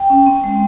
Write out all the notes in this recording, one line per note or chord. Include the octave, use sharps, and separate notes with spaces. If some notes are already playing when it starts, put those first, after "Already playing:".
Already playing: G5
C#4
C4
G#3